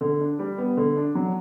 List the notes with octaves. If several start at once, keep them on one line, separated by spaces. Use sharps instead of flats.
D3
D4
G3
B3
D3
D4
F#3